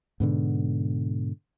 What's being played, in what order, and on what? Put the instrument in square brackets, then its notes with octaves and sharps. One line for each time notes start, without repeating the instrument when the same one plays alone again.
[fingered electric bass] G#2 B2 D3